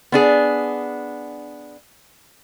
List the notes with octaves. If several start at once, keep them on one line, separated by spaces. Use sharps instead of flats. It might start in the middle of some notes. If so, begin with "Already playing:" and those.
B3 D4 G#4